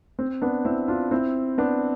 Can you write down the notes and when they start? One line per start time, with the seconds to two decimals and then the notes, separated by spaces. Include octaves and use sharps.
0.19 C4
0.42 B3 D4
0.65 C4 E4
0.88 D4 F4
1.11 C4 E4
1.58 B3 D4